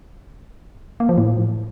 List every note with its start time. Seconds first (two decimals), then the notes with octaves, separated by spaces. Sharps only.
1.00 A#3
1.09 F3
1.18 A2